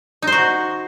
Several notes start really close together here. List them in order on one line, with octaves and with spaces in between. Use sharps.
D#4 C5 F#4